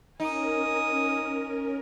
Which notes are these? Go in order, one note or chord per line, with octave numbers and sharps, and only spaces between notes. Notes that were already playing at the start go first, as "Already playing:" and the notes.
C#4 D#4 A#4 G#5 D#6